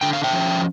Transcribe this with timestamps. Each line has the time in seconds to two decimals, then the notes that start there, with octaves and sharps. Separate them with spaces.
0.01 D3 G5
0.13 F5
0.24 E5 G5
0.33 F3 C#4